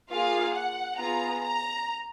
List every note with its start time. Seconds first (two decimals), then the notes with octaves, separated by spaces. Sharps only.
0.11 A#3 F4 G#4 F5
0.54 F#5
0.99 B3 F4 G#4 A#5
1.44 A#5